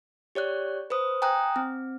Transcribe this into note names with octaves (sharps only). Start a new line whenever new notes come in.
G4 C#5 D5 F#6
B4 C5 D#6
G5 G#5 A#5 D#6 F#6
C4